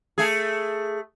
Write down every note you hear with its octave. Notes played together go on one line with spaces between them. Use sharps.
A3 G#4